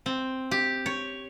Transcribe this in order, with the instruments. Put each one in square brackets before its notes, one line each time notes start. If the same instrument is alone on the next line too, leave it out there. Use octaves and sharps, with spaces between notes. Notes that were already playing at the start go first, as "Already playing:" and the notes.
[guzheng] C4
G4
C#5